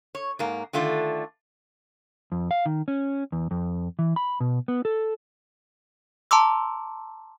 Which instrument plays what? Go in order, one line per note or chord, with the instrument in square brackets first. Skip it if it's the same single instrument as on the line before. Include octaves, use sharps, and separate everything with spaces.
[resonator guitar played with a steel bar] C#5
G#2 A#3
D3 D#3 A3 F4 D5
[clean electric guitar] F2
F5
D#3
C#4
E2
F2
E3
B5
B2
B3
A4
[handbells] A5 A#5 C6 D6 E6